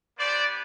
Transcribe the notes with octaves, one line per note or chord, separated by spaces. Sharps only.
B3 D4 G4 C5 D5